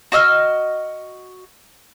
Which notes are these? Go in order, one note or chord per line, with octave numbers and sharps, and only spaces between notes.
F#4 D#5 E6 F6